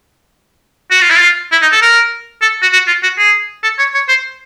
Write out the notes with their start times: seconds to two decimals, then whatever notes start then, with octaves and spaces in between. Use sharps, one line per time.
0.91 F#4
1.01 F4
1.10 E4
1.19 F4
1.52 E4
1.62 D#4
1.72 A4
1.82 A#4
2.42 A4
2.62 F#4
2.73 F#4
2.87 F4
3.03 F#4
3.18 G#4
3.63 A4
3.79 C#5
3.94 C#5
4.08 C5